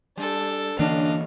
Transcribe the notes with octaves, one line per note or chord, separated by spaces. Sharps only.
G3 D4 A4
D3 E3 A#3 C#4 D4 D#5 F5